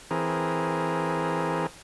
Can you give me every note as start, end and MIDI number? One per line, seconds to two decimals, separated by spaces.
0.11 1.67 52
0.11 1.67 60
0.11 1.67 68
0.11 1.67 70